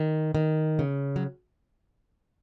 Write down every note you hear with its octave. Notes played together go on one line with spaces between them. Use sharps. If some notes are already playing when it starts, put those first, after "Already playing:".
Already playing: D#3
D#3
C#3
F#3